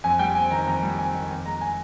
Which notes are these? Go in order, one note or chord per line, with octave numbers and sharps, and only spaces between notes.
F2 G#5
G3 G5
C4 G#5
D#3 A#5
F2 A#5
G3
C4 G#5
D#3
F2
G#3 A#5
G#5